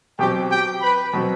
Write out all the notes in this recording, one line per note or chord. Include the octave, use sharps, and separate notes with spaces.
B2 F#3 C4 G4 G5
G4 G5
B4 B5
B2 F#3 C4